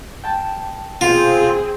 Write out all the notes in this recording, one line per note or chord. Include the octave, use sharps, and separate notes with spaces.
G5 A5
B2 C4 F4 G#4 F5